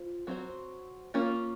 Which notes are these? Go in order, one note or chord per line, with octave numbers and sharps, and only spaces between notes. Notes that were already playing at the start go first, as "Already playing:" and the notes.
Already playing: F4 C5
F#3 C4 F#4 C5
A#3 C#4 F4